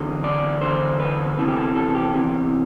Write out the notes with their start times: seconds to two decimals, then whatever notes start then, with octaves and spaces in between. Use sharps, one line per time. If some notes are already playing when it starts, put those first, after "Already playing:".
Already playing: E2 D3
0.24 D5
0.61 E2 D3 C5
1.00 B4
1.38 E2 C3 E3 A4
1.48 G4
1.57 A4
1.76 A4
1.95 G4
2.14 E2 C3 E3